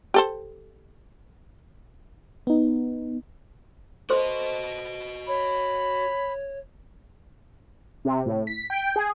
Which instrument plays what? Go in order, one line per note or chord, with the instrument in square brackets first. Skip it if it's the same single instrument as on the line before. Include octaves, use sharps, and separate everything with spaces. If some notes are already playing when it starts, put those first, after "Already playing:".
[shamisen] G4 A4 C5
[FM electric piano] B3 D#4
[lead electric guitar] F#4 D#5 [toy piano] A4 C5 C6
[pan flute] C#5 [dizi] B5
[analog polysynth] C3
A2
B6
G5
G#4